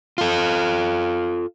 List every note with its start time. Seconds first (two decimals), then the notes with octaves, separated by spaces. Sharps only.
0.18 F4 A4